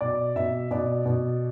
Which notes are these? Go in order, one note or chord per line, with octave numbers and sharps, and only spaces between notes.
B2 D5
B2 E5
B2 D5
B2